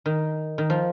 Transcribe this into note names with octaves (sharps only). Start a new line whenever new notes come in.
D#3
D#3
F3